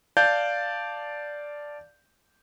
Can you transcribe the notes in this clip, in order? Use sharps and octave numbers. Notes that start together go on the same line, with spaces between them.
D5 F5 A5 G6